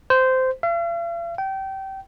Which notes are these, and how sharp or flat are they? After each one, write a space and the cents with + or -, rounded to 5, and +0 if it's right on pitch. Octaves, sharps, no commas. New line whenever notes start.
C5 -15
F5 -45
G5 -25